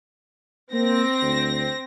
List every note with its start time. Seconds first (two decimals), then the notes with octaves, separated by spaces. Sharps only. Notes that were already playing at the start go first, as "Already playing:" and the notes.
0.73 A#3 C4 A#6
1.22 D2